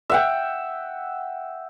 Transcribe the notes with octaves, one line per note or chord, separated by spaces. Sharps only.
E5 F#5 G5